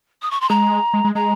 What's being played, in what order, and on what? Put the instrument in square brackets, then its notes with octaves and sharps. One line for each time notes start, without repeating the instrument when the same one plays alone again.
[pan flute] D#6
C#6
C6
[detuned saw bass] G#3 [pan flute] A#5
[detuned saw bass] G#3
G#3
[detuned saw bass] G#3 [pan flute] A#5